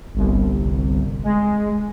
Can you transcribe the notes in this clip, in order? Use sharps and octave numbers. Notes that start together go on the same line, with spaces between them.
G1 C2
G#3